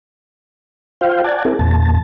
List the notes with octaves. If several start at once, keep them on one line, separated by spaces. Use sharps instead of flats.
F4 C5 F5 G5
D5 F#5 G#5 A5
C4 E4 G#4 A#4
E2 A#2 A5